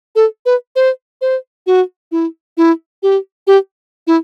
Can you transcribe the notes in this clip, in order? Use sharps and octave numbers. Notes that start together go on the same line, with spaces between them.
A4
B4
C5
C5
F#4
E4
E4
G4
G4
E4